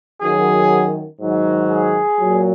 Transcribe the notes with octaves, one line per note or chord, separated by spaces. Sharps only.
F#2 D#3 F#3 G#4
G#2 D#3 F#3
G#4
A#2 F#3